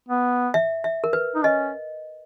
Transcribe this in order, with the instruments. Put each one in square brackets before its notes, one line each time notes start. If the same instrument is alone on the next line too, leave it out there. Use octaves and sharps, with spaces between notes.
[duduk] B3
[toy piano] E5
E5
A#4
B4
[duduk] D#4
[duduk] C#4 [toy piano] D#5